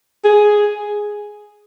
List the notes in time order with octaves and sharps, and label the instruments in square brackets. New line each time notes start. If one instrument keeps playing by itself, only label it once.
[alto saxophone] G#4